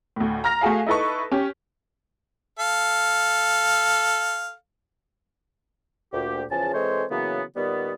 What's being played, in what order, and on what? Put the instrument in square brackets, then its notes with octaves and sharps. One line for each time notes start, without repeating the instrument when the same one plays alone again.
[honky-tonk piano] D2 A2
A#5 F6 A#6
A3 F#4 G#4 F5
D#4 E4 A4 B4 C#6
C#4 G4
[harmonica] A4 F5
[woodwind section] D2 A#2 G4
E2 C#3 F3 G#5 A5
E3 G#3 C4 A4 C5 C#5
C#3 E3 F#3 A#3 B3
A#2 D#3 G3 B3